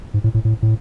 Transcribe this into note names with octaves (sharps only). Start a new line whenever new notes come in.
G#2
A2
A2
A2
A2